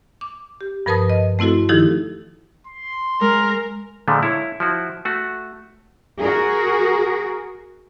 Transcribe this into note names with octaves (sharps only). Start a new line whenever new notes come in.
D6
G4
G2 F3 A#4 B4 A5 D#6
D#5
A3 C4 E4 F#4 A4
D#3 F3 D#4 E4 G4 A4
C6
G#3 A#4
A#2 D3 F3 G#3 A3
E4 C#5
F3 E4 F#4
A3 F#4
F#4 G#4 A#4